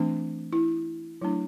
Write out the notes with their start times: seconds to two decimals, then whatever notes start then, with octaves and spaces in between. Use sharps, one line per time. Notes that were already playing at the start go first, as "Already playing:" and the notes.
Already playing: E3 A3 C4 D4
0.53 E4
1.22 F#3 A3 D4 E4